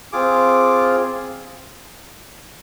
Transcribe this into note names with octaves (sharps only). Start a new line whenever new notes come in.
C4 F4 G#4 D6